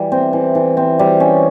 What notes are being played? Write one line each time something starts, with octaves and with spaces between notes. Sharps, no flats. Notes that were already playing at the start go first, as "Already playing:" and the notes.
Already playing: E3 G3
C4
E3
E3
C4
G3
C#4